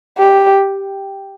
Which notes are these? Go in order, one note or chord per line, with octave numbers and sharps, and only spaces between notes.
G4